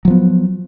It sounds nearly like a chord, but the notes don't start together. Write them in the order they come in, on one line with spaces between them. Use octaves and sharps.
F#3 F3 B3